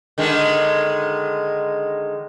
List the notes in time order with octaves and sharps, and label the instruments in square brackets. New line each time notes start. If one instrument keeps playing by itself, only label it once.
[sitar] D3 D#3 G#3